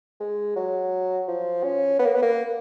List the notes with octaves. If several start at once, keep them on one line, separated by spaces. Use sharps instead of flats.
G#3
F#3
F3
C#4
B3
A#3
B3
A#3